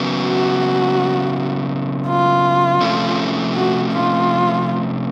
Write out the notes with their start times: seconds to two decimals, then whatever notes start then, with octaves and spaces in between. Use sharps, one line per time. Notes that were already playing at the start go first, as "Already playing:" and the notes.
Already playing: C#3 F#3 B3
0.22 F#4
2.08 F4
2.81 C3 F3 A3 C#4
3.55 F#4
3.93 F4